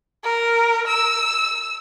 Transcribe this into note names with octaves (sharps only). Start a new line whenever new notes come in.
A#4
E6